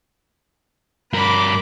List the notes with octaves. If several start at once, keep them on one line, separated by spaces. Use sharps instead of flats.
G2 A#4 B5 D6